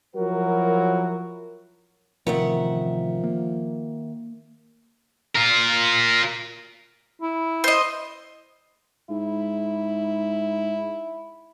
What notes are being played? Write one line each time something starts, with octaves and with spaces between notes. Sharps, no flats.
F3 F#3 E4 F#4 A#4
A1 C3 D#3 F3 E5 F#5
A#3
F4 A#4
E4
C5 D#5
G#2 E4